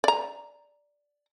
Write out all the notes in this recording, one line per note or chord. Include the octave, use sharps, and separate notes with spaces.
D5 A#5